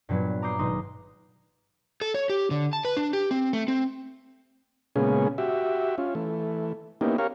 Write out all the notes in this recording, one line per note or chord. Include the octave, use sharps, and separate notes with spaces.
G2 A#2 F#3 B3
A#5 D6 D#6 G6 C7
G#1 B2 D#4 C6 D#6
A4
C#5
G4
D3
A5
B4
D4
G4
C4
A3
C4
A#2 C#3 G#3 B3 C#4 G#4
F#4 G4 E5
C#4 F4
E3 A3
A#3 B3 C#4 D#4 E4 G4
G4 A#4 C#5 F5